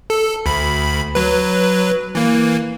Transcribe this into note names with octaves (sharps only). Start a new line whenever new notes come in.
A4
D2 B5
F#3 B4
E3 A#3